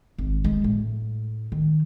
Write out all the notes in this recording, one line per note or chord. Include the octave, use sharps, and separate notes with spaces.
G#1
G#3
A2
D#3